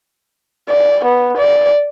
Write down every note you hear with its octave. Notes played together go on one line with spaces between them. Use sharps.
D5
B3
D5